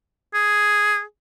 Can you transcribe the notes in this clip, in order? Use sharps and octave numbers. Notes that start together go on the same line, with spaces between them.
G#4